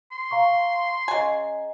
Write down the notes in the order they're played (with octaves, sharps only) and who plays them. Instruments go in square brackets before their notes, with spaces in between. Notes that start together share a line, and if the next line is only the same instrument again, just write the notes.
[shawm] C6
[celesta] F5 A#5 C#6
[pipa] C#3 G#5 [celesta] D#5 A#5